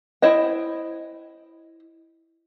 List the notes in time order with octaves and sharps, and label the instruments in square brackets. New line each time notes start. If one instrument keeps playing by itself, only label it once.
[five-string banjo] E4 C5 D#5 G5